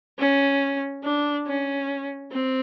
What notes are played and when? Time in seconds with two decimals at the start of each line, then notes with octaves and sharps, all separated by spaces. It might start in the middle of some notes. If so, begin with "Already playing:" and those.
0.19 C#4
1.04 D4
1.47 C#4
2.32 C4